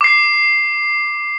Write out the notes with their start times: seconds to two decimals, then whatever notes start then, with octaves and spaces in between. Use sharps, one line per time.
0.01 D6 C7